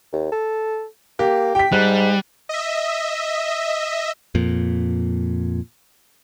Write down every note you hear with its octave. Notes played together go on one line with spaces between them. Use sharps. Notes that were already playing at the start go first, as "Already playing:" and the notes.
D#2
A4
A#3 G4
G4 G5 B6
G#2 G3 F#6
D#5 E5
F2 A#2